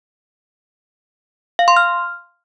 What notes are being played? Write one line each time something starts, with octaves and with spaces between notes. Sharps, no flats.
F5
C6
F6